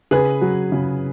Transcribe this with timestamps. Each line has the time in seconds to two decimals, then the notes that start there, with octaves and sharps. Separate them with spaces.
0.11 C#3 G#4 B4
0.41 F#3
0.72 C#3